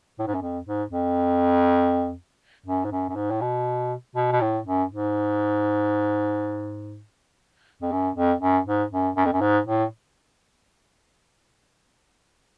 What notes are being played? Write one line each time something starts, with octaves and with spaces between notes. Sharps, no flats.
A2
G#2
F#2
F2
G#2
F2
F#2
G#2
F#2
F#2
G#2
A2
B2
B2
B2
A2
F#2
G#2
F2
F#2
F2
F#2
G#2
F#2
F#2
F2
F#2
G#2
A2